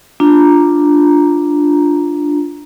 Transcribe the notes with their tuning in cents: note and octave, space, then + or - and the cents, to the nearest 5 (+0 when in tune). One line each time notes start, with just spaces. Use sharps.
D4 +0 F4 -5 A#5 +0